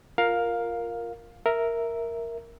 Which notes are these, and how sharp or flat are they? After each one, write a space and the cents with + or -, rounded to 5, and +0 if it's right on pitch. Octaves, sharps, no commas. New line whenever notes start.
F4 +0 A#4 +0 F5 +10
A#4 +0 E5 +0